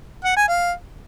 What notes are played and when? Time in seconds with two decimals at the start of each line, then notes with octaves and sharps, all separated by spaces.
0.25 F#5
0.36 G#5
0.48 F5